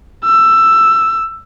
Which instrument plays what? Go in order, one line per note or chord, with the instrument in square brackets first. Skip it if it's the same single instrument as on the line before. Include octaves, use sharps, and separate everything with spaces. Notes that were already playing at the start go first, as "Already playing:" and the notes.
[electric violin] E6